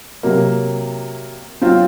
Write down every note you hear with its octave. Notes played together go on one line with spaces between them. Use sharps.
C3 F#3 A#3
F#3 C4 F4